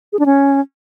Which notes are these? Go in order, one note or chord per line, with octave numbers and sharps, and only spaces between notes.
G#4
D4
C#4